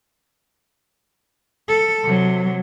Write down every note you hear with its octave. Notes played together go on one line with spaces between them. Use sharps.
A4
C3 F#3